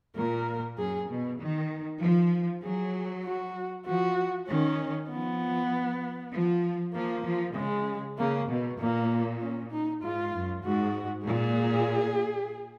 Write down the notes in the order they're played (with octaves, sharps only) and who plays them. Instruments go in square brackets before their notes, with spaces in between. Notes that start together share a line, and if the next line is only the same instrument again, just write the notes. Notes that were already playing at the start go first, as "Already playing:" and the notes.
[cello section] A#2 [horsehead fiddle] A#4
[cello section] F#2 [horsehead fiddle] G#4
[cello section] B2
D#3
F3
[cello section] F#3 [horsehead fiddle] G#4
[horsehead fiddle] F#4
[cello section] F3 [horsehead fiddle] F#4
[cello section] D#3 [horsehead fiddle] C#4
[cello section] F3 [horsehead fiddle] B3
[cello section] F3
[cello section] F3 [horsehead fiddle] A#3
[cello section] F3
[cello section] C#3 [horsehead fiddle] G#3
[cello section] C#3 [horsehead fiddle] A#3
[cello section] B2
[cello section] A#2 [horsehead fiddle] A#3
[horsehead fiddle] C#4
D#4
[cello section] G#2 [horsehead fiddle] F4
[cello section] F#2
[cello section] G#2 [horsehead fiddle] F#4
[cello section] A#2 [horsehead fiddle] G#4